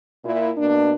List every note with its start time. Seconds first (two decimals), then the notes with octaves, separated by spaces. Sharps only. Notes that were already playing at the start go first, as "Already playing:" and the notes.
0.25 A#2 E4
0.58 B2 A#3 D4